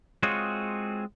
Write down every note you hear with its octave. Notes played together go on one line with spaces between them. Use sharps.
G#3 C4 F4 F#4 G#4 C#5